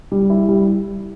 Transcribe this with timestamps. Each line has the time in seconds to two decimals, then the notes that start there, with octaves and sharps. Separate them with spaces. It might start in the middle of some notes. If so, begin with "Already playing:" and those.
0.12 G3
0.30 E4
0.49 G3